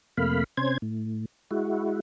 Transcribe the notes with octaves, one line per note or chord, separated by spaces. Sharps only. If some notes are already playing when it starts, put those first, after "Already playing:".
F2 C3 A3 A#3 F5 B5
C3 C#4 C5 G#6
A2
G#3 E4 F#4